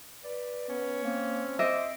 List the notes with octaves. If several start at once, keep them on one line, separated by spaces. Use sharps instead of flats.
B4 D5
B3 C#4
A#3 C4
C5 D#5 E5 D6